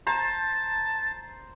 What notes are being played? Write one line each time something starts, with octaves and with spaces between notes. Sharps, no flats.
C5 A5 A#5